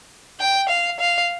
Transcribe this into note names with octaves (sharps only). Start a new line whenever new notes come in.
G5
F5
F5